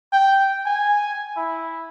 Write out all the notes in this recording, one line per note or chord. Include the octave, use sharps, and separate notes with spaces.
G5
G#5
E4